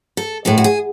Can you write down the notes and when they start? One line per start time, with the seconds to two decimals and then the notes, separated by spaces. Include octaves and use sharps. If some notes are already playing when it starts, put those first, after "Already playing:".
0.17 A4
0.45 A2 G#3 A4
0.58 F#4
0.64 G#4